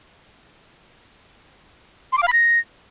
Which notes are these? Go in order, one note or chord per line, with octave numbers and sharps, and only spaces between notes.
C6
D6
F5
B5
A#6